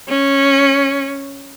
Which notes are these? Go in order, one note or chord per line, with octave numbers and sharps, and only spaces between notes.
C#4